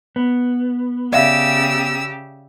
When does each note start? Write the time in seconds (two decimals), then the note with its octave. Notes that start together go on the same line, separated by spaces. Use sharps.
0.16 B3
1.13 C#3 G4 D5 E5 F5 E6